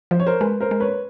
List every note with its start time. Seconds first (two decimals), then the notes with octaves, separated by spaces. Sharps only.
0.11 F3 C5
0.20 C#5
0.26 A#4 C5
0.40 G#3 B4
0.61 A#4 C5
0.71 G#3
0.80 B4 C#5